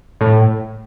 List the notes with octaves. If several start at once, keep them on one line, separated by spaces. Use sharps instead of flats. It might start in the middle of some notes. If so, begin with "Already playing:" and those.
A2